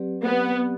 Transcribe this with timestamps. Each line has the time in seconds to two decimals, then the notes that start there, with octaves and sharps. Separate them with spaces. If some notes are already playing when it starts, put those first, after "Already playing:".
Already playing: F#3 C4 G4 B4 D5
0.23 B3